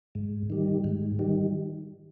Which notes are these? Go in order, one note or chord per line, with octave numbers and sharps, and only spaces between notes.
G#2
D#3 G3
G#2
D#3 G3